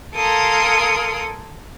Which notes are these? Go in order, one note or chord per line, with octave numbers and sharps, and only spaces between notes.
A4 A#4 F5 G#5 C6 D#6